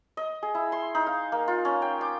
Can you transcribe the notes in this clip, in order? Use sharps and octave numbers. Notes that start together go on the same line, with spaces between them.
D#5
G#4
E4
C6
D#4
F5
A#3
F4
C#4
G5
D6